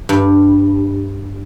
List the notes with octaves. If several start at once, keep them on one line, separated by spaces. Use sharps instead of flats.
G2